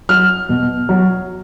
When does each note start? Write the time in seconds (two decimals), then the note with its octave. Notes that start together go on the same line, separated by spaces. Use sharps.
0.09 F#3 F6
0.49 B2
0.89 F#3